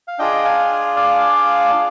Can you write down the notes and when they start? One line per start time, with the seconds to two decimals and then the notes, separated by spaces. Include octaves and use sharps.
0.08 F5
0.19 D4 F4 G#4 D#5 G5
0.45 F5 G#5
0.96 D5 F5
1.74 D4